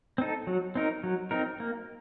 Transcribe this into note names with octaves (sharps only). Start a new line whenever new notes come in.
C4 D#4 A4
F#3
C4 D#4 A#4
F#3
C4 D#4 A#4
A#3